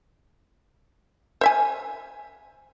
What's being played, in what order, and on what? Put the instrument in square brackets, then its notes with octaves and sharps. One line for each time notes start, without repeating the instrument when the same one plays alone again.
[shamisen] C5 E5 G#5